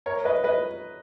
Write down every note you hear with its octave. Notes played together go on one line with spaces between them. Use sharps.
A#4 C#5
B4 D#5
B4 D#5